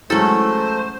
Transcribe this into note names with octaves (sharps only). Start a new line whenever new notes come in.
E3 F#3 G#3 A3 C#4 A4 C5